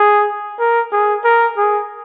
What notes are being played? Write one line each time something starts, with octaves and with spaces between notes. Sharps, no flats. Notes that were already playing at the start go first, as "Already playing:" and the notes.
Already playing: G#4
A#4
G#4
A#4
G#4